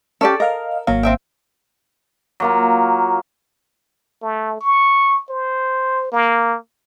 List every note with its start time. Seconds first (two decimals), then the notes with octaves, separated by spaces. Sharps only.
0.21 C#4 G4 A4 D5 A5
0.40 A#4 D#5 F5 F6
0.87 G#1 F#3 A#3 F5
1.03 C4 E5 G5
2.40 F#3 A#3 F4
4.22 A3
4.61 C#6
5.30 C5
6.12 A#3